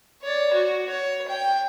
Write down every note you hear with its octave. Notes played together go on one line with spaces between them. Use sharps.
C#5 D5
F#4
C#5
G5